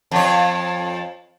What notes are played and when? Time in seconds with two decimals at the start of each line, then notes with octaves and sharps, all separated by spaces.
0.11 F2 C#5